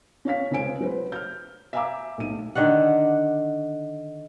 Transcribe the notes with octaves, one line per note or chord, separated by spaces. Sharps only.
C#4 C#5 F5 B6
C#2 C#3 C5 G#5 D7
F#3 B4 C5
F6 G6
E5 F5 G#5 A#5 D6 E6
B1 A2 D#7
D3 D#3 D5 F#5